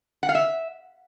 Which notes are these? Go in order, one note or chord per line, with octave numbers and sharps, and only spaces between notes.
F#5
F5
E5